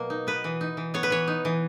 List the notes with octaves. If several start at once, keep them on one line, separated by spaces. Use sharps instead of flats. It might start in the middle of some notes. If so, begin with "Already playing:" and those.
Already playing: B2 F#3 A#3
D#4
B3 B4
E3
D#4
E3
B3 C#5
B4
E3 C#5
D#4
E3